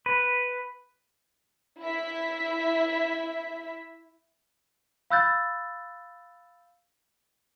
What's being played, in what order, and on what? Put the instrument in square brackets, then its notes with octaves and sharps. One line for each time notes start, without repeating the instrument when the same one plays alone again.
[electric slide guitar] B4
[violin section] E4 E5 B6
[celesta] F5 B5 E6 F#6 G6 A6